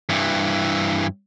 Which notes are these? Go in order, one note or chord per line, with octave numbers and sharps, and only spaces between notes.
G2 E3